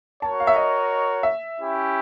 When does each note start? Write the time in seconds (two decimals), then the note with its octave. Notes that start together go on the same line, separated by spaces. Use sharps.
0.22 F#4 A#4 C#5 A5
0.40 F5
0.47 E5
0.56 D#5
1.23 E5
1.58 C#4 E4 G4